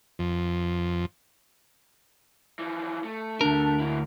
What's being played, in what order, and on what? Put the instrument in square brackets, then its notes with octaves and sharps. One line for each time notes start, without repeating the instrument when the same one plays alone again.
[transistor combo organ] F2
[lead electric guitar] E3 F3
A3
[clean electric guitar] D2 A#4 [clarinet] D4
[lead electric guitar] A#3 E4